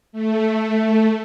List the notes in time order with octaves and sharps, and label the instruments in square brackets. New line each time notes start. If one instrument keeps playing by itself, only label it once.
[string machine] A3